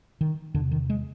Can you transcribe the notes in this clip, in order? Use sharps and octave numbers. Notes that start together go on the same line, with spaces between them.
D#3
E2 C3 D3
D#3
G#3